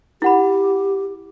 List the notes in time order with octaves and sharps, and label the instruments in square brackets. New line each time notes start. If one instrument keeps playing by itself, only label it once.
[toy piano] E4 F#5 B5 [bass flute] G4